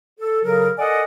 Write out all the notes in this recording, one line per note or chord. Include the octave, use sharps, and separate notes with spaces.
A4
C#3 F#3 A4 A#4
A4 A#4 D5 D#5 F#5 G#5